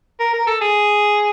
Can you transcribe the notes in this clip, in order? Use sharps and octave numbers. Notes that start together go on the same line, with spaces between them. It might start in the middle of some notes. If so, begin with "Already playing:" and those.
A#4
A#4
A4
G#4